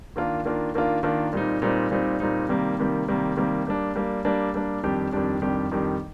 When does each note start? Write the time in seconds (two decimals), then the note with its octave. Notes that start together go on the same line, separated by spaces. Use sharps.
0.16 D#3 A#3 D4 F4
0.45 D#3 A#3 D4 F4
0.74 D#3 A#3 D4 F4
1.03 D#3 A#3 D4 F4
1.33 A#2 G3 C4 D#4
1.62 A#2 G3 C4 D#4
1.91 A#2 G3 C4 D#4
2.20 A#2 G3 C4 D#4
2.49 C3 D#3 G3 A#3
2.78 C3 D#3 G3 A#3
3.08 C3 D#3 G3 A#3
3.37 C3 D#3 G3 A#3
3.67 G3 A#3 D4
3.96 G3 A#3 D4
4.25 G3 A#3 D4
4.54 G3 A#3 D4
4.83 F2 D#3 G3 D4 G4
5.12 F2 D#3 G3 D4 G4
5.42 F2 D#3 G3 D4 G4
5.71 F2 D#3 G3 D4 G4